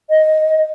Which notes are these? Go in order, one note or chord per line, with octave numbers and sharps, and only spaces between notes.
D#5